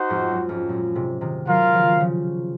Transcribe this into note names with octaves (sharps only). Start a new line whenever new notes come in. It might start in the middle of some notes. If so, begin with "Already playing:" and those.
Already playing: D#4 F#4 C5 F#5
F2 G#2
G#2
F#2
F2 G#2
F#2 A#2
G#2 C3
C3 D#3
D#3 F#3 F4 A#4 F5
C#3 F3
C#3 F3